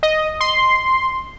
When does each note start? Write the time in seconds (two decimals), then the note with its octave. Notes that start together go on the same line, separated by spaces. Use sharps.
0.03 D#5
0.40 C6